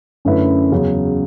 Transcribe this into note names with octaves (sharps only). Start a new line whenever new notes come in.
F#2 D3 A3 E4 B4
E2 C#3 F#3